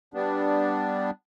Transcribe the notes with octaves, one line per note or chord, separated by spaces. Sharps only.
G3 B3 D4